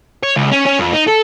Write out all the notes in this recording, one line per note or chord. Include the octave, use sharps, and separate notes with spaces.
C#5
C#2
C#4
C#4
F2
D#4
A4